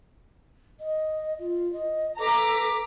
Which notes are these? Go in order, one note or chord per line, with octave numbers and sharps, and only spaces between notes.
D#5
F4
D#5
A4 B4 A#5 D6 B6